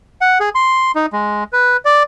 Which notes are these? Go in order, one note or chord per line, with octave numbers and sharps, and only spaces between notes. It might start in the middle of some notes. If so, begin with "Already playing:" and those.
F#5
G#4
C6
D#4
G#3
B4
D5